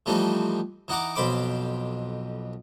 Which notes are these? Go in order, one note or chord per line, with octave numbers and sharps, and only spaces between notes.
E3 F3 G3 A3 C4 D#4
E3 D#4 F#5 A#5 D6
B1 F2 C5 B5 D6